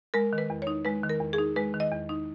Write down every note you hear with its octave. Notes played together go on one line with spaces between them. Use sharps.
G#3 A#4
D#3
B4
E2
C#5
D#4
G#3 B4
D#3
A#4
E2
G#4
D#4
G#3 B4
D#3
D#5
E2
D#4